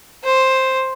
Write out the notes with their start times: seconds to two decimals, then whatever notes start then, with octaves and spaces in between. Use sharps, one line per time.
0.24 C5